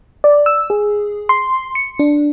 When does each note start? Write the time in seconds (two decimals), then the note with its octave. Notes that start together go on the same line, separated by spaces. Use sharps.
0.24 D5
0.46 E6
0.70 G#4
1.29 C6
1.75 C#7
1.99 D4